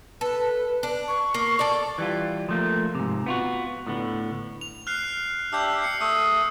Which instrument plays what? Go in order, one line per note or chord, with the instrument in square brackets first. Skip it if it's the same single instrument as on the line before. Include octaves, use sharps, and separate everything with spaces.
[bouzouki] A4 [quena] B4
[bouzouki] D4
[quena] C#6
[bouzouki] A#3
A4 D5
[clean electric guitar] E3 G3 F4
F3 A3 A#3
G#2 C3
B3 F4 F#4
A2 D3 B3
[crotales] F7
F6 F#6 C7
[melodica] D4 G4 E5 [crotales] E6 G6
[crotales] C7 C#7
[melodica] A3 E5 D#6 [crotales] E6